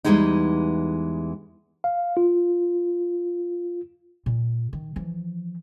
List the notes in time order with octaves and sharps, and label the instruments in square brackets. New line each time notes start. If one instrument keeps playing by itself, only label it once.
[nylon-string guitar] E2 A#2 E3 G3 G#3 D#4
[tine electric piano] F5
F4
[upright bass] A#2
D#3
E3 F3